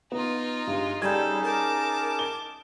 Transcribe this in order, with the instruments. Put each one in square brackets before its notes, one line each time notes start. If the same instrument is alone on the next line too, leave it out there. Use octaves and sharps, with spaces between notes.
[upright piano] B3 [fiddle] D#4 F4
[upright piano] G2 [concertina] G#3
[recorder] G3 [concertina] C#4 D#4 G#4 [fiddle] A4 [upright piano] G#6
[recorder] A#4 [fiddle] A5 D6
[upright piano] G7